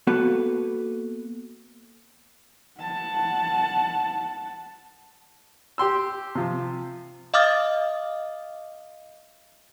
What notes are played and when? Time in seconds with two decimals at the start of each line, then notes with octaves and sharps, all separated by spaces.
0.07 A#3 B3 F#4 A4 B4
2.80 F#5 A5
5.78 G4 G5 C6 E6
6.35 C3 F3
7.34 D#5 F5 D6 D#6 F6 A6